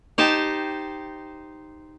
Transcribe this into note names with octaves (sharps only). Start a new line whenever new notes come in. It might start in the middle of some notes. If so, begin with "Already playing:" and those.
D#4 G4 C5 A5